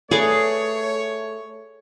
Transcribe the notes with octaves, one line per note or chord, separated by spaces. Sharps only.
A3 G#4 A4 B4 C#5 D5